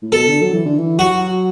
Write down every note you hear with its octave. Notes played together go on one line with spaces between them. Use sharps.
A2
B2 A4
D3
F#3
E3
D3
E3
F#3 F#4